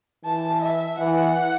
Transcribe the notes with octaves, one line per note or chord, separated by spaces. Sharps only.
E3 A5
E5
E3 F#5